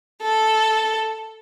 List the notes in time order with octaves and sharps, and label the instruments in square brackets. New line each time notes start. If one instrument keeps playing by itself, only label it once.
[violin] A4